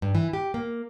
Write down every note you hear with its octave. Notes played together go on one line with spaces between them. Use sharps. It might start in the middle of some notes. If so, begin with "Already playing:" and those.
G2
E3
G4
A#3